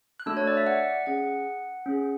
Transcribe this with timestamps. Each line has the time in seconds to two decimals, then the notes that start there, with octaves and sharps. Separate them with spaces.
0.20 F#6
0.26 A3 D4 F#4 A4 E6
0.37 C#5
0.47 D5
0.57 E5
0.67 F#5
1.06 C#4 G#4 F#5
1.86 C#4 G#4